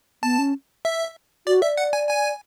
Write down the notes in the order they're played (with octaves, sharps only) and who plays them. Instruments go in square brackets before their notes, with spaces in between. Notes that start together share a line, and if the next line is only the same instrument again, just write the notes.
[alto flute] B3 [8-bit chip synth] A5
[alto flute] C#4
[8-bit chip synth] E5
[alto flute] F#4 [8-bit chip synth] D5
[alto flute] D5 [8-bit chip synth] E5
[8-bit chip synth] F#5
G#5
G#5